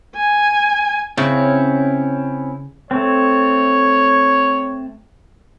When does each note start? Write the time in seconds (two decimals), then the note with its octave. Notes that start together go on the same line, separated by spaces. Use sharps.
0.16 G#5
1.17 C#3 C4 C#4 E4
2.91 A3 C4 C#5